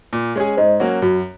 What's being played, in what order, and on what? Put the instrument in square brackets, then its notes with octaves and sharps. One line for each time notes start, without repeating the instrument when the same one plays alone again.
[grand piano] A#2
G#3 C#4 G#4
[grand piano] G#2 [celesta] C5 D#5
[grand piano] F#3 A#3 C#4 F#4
[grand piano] F#2 [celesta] F#4